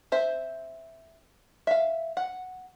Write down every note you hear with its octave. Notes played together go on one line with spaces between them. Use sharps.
C4 C5 E5
E5 F5
F#5